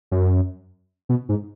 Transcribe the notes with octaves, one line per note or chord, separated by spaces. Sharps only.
F#2
B2
G#2